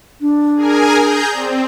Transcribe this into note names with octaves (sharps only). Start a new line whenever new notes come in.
D4
G#4 A#4 G#5
G#4 A#5 G6
C4 D5